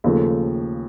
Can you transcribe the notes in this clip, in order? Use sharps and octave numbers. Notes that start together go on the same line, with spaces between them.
D#2 C#3 F3 A3